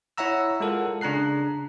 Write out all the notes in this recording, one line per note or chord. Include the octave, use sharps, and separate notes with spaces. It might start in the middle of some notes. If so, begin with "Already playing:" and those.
E4 C#5 E5 F#5 A#5 E6
G#3 F4 A4 A#4 F#5
C#3 D4 A#5 F#6 C7